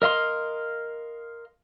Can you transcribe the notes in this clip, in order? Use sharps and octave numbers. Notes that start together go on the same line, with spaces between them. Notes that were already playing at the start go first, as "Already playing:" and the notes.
A#4 D#5 F5 C6